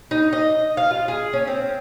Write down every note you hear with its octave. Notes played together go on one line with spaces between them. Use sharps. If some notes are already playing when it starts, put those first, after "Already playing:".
D#4
D#5
F5
F4
G#4
C#4
C4